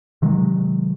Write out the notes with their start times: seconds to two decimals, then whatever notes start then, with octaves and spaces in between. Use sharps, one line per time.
0.22 C3 D#3 F#3 G#3